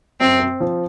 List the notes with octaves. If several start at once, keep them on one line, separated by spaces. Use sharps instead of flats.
F#2 C4
C4
F3